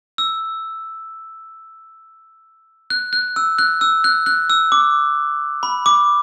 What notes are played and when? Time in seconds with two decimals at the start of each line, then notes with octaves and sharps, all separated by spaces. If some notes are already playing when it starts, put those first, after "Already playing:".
0.18 E6
2.90 F#6
3.13 F#6
3.36 E6
3.59 F#6
3.81 E6
4.04 F#6
4.26 F#6
4.50 E6
4.72 D6
5.63 B5
5.86 D6